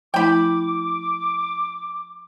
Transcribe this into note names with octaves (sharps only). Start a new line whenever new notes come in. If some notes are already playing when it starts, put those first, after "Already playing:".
F3 A3 E4 G5 B5 D6